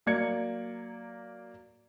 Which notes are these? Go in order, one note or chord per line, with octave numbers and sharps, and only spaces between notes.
F#3 A#3 D5 G#6 C#7